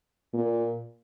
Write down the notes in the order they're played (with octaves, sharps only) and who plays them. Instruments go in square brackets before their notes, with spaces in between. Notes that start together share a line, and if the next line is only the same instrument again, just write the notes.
[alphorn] A#2